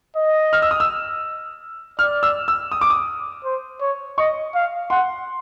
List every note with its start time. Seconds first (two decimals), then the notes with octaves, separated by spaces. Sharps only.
0.17 D#5
0.53 F6
0.62 E6
0.71 D#6
0.80 E6
1.99 D5 F6
2.23 E6
2.48 E6
2.72 D#6
2.81 D6
2.90 D#6
3.45 C5
3.81 C#5
4.18 D#5 C#6
4.55 F5
4.90 F#5 C6